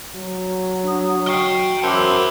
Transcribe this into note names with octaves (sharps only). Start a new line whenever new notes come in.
F#3
D4 D#6
F#4 D#5 G5 C#6 C7
F#2 E4 C5 E5 F#5 A5 D6